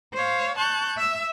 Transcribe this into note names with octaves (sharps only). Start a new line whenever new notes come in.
C5 C#5 F5
A5 C#6 F#6 G6
E5 E6